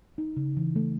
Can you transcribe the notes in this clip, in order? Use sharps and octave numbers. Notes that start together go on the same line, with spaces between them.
D#4
C#3
E3
A3